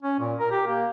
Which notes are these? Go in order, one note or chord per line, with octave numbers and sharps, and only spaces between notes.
C#4
A#2
A#4
G4
A#3